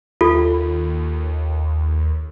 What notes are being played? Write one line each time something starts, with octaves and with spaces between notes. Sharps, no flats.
D#2 F4 A4